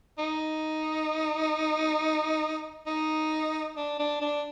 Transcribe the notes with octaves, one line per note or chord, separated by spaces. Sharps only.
D#4
D#4
D4
D4
D4